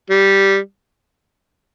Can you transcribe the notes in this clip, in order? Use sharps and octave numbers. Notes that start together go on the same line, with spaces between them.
G3